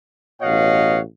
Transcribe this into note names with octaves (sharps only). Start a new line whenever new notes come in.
A1 B2 C#5 D#5 F5 F#5